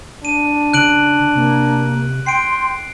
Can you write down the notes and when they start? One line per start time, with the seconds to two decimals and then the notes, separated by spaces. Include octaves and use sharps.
0.25 D4 D#7
0.74 C#3 F#6 D7 F#7
1.35 C3 A#3
2.26 G5 C6 C7 D7